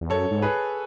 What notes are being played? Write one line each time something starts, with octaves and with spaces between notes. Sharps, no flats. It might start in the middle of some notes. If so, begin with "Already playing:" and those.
E2
F#2 A4 C#5
G#2
G#4 B4